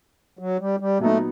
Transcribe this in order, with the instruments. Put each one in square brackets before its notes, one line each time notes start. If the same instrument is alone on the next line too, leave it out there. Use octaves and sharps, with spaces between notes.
[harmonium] F#3
G3
G3
[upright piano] A#2 F#3 B3 D#4 [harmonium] A3